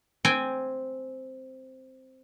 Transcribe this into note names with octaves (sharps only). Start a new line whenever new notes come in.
C4 G5 G#5